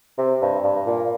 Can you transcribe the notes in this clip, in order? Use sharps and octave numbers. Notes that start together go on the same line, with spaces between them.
C3
G2
G2
A#2